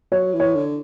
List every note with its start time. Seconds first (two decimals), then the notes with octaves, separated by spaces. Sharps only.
0.12 F#3 C#5
0.33 E3
0.40 C#5
0.55 D3